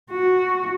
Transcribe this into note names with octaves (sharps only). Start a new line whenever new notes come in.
F#4